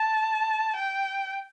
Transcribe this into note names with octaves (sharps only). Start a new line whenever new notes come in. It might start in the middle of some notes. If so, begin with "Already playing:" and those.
Already playing: A5
G5